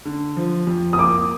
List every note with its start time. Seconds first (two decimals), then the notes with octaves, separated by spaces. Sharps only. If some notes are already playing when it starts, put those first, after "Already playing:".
0.05 D3
0.37 F3
0.67 F2
0.93 D#6
0.98 A#3 D6